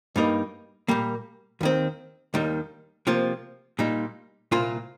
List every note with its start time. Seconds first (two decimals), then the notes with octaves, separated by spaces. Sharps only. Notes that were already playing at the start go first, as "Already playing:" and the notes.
0.16 G2 G3 A#3 D#4
0.88 A#2 G3 A#3
1.61 D#2 D#3 C4
2.34 D#2 D#3 G3
3.07 C3 F3 A#3 F4
3.79 A#2 G3 D#4
4.52 C2 A#2 A#3 F4